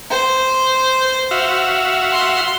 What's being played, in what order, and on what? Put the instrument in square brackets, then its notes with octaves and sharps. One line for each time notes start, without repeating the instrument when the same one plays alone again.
[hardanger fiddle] C5
[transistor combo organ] F#4 E5 F5
[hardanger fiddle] C6